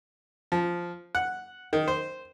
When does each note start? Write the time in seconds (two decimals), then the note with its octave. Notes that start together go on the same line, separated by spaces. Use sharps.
0.52 F3
1.15 F#5
1.73 D#3
1.88 C5